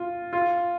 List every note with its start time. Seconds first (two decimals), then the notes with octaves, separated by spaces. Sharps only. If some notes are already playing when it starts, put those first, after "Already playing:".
Already playing: F4
0.33 F4